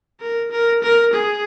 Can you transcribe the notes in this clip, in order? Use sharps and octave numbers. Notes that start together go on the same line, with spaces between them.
A#4
A#4
A#4
G#4